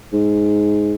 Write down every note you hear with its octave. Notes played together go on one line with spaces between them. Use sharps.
G#2